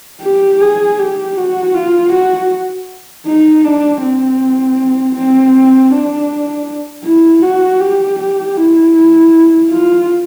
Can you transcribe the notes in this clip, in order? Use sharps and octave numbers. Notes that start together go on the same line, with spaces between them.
G4
G#4
G4
F#4
F4
F#4
D#4
D4
C4
C4
D4
E4
F#4
G4
G4
E4
F4